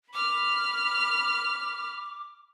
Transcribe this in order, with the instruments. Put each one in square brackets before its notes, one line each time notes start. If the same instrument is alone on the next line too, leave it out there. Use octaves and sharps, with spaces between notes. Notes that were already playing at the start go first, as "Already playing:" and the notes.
[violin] B5 F6 [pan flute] D6